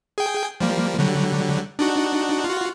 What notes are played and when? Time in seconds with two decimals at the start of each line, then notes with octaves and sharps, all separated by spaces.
0.18 G#4 G5
0.61 F3 G3 A#3
0.99 D3 F#3 G3
1.79 D4 D#4 F#4
2.44 F4 F#4